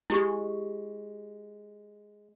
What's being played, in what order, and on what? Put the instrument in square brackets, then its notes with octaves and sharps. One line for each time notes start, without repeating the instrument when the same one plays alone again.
[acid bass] G#3 [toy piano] E4 G4 C#6